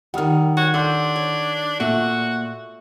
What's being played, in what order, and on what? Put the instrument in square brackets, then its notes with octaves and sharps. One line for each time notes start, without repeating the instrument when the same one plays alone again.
[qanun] D#3 G3 [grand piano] F#5 D#6 F6
[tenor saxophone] F#4 [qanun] C#5
[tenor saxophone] D4 [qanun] A4 [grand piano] F#5 C6 G6
[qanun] C#5
[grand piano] A#2 [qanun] A3 [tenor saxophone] F#4